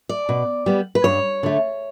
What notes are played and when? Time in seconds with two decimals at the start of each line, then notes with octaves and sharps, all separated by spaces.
0.09 D5
0.29 B2
0.66 G3 B3
0.95 B4
1.04 G2 C#5
1.43 D3 A3